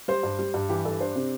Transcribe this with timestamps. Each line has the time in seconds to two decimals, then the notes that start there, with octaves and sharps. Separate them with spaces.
0.08 G3 C5
0.23 G2
0.39 G3
0.54 G2
0.69 E3 G4
0.85 G2 A4
1.00 D4 C5
1.15 C3